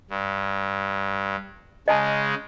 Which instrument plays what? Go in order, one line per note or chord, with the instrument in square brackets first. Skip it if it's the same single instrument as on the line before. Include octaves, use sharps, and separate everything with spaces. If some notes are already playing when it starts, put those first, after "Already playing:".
[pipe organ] G2
[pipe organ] C#3 G#3 [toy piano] D#5 G#5 A5